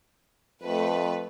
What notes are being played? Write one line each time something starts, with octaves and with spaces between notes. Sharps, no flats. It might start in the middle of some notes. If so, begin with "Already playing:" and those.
F2 A3 B4